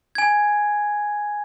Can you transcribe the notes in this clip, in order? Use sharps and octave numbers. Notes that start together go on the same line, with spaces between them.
G#5 G#6